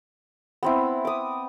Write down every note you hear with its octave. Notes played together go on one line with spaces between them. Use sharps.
B3 C4 E4
D6 D#6